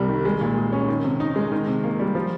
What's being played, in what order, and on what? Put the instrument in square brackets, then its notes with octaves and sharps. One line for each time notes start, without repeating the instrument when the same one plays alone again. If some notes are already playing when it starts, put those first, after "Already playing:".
Already playing: [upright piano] C2 C3 G3
D#3
G#3
A#2
G#4
C#4
D#3
C3
D#4
G#3
D#3
C3
A#3
G3
F3